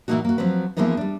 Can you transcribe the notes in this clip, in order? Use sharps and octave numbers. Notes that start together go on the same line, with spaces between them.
A#2 E3 A3 A#3 D#4 F#4
A#3 F#4
F3 F#3 C4 B4
E3 F3 G#3 A#3 B3 D#4
G3 D4